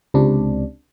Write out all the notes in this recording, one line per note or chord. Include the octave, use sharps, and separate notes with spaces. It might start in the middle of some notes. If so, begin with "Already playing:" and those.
C#2 C3 D4